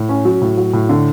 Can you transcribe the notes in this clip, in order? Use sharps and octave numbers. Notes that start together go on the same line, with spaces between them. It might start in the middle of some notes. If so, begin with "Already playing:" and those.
Already playing: A2
C#4
F#3
A2
F#3
A2
D3